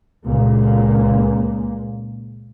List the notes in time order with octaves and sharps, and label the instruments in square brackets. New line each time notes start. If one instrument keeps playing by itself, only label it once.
[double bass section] C#2 A#2 A#3